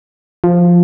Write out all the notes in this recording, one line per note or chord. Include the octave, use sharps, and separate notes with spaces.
F3